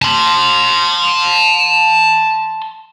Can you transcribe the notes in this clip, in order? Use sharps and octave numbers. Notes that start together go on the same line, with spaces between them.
A5 C6